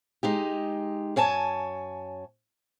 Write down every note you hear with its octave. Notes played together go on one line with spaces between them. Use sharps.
G#3 D#4 G4
F#2 C#5 G#5 A5